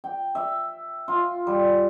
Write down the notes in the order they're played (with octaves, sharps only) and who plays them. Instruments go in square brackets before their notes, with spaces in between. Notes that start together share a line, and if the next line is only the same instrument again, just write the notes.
[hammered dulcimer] G5
E5
F4
G3